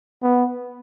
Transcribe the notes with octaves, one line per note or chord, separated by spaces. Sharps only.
B3